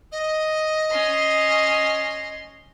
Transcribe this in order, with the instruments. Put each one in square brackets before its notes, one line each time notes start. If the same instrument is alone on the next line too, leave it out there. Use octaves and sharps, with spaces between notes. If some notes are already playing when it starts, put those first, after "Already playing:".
[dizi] D#5
[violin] C#4 C6